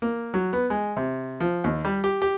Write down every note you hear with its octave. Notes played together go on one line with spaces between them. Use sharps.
A#3
F#3
B3
G#3
C3
F3
D#2
G3
G4
G4